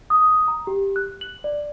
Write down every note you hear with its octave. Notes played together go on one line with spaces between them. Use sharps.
D#6
A#5
G4
F#6
F#7
D5